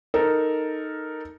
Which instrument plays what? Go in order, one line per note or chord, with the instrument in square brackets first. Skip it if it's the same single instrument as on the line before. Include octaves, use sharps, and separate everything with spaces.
[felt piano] D#4 A4 A#4